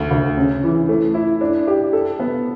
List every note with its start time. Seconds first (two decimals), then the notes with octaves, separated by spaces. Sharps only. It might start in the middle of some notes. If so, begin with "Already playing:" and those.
Already playing: D2
0.11 D2
0.37 C#3
0.63 E3
0.89 A3
1.14 E4
1.41 D4
1.67 G4
1.93 A4
2.19 B3